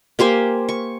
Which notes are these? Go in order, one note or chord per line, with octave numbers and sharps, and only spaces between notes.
A#3 G4 C5 G#5
C#6